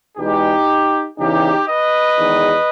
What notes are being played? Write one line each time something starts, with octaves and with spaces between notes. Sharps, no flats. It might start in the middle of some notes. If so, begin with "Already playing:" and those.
E2 B2 G#3 D#4 G4
E2 C#3 E3 D#4 G4
B4 D#5
E2 D#3 G#3